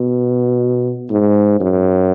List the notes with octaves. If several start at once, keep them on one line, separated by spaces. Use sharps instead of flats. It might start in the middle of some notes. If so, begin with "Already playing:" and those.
Already playing: B2
G#2
F#2